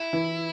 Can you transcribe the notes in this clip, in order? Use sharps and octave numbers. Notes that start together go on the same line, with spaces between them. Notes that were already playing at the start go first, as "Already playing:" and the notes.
Already playing: E4
E3